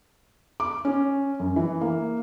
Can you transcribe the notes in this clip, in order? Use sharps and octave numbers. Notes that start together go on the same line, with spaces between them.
D6
C#4
F#2
E3
A#3